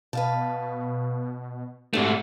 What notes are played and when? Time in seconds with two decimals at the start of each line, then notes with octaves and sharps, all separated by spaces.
0.13 B2 B4 F5 A5
1.93 G#2 C3 A3 D4 F#4